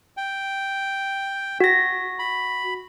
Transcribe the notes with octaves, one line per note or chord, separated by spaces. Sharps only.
G5
F#4 A#6
B5